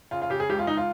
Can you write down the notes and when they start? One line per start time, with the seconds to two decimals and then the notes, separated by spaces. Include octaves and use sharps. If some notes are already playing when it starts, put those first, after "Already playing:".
0.11 C#3 F4
0.22 F4
0.30 C#3 G4
0.40 G#4
0.50 C#2 G4
0.59 F4
0.67 C#2 D#4
0.77 F4